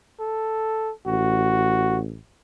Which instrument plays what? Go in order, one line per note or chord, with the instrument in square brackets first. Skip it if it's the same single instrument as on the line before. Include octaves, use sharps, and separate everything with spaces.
[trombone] A4
[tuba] A1 [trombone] F#4